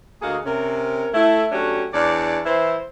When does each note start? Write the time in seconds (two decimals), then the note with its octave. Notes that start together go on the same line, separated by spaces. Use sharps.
0.22 D2 A#3 F#4 G#4 D#5 F5
0.46 C3 C#4 A#4
1.14 A3 E4
1.52 F#3 A3 C#4 D4 F#4 G4
1.94 E2 D4 C#5 D5
2.46 E3 E4 C5